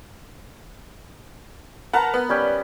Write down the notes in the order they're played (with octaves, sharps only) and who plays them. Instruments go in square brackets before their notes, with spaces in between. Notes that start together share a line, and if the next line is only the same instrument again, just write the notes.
[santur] A#4 B4 [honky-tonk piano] F#5 A5 A#5
[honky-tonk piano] B3
[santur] G3 C#4 G5